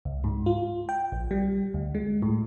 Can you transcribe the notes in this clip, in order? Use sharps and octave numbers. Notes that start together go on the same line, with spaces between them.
C#2
G#2
F4
G5
A#1
G3
D2
G#3
A2